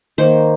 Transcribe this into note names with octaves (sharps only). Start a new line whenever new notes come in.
D#3 A#3 C5